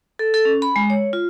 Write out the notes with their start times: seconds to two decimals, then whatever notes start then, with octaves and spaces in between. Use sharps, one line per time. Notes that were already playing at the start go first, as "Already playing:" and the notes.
0.19 A4
0.34 A4
0.45 C#4
0.62 B5
0.76 G#3
0.90 C#5
1.13 F4